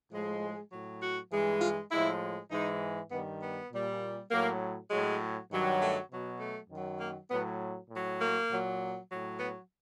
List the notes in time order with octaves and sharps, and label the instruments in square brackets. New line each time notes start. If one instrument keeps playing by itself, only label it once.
[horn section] A2 F3 G#3
G#4
A2 F#3
F#4
G2 E3 G#3
F4
A2 F3 G#3 E4
G#2 E3 G#3 D#4
G2 D#3 G3 B3
B3
A#2 G3
A2 F#3 A#3
A2 F#3 G#3
G2 D#3 F#3
A3
B2 F#3
A3
F#2 D#3 F#3
A#3
A2 F#3 B3
A2 F#3
A#3
A#2 F#3
A2 F#3
B3